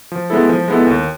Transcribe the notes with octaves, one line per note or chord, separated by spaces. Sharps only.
F3
G#3 B3 E4 A4
F3
G#3 B3 E4 A4
D#2